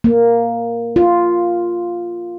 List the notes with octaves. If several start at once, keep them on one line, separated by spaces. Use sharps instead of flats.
A#3
F4